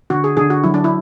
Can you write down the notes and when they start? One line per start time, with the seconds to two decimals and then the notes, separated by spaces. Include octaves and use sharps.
0.10 D3 F#4
0.24 G#4
0.37 D3 G#4
0.50 F#4
0.64 F#3 E4
0.74 D4
0.84 E4